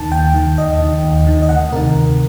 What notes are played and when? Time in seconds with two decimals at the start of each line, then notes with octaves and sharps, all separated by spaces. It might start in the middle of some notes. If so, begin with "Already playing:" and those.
Already playing: D#2 D#3 A5
0.12 D#2 G5
0.34 D#3
0.58 D#2 D#5
0.81 D#3
1.03 D#2
1.27 D#3
1.42 D#5
1.49 D2 F#5
1.72 C3 D#3 A#4
1.95 D2